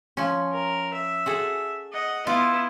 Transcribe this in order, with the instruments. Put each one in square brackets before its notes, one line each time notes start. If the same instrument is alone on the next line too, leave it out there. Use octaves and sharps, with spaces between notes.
[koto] F3 C#4
[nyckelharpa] A#4
E5
[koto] F#4 G#4 A4
[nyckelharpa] D#5 F#5
[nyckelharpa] B3 E4 [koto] F4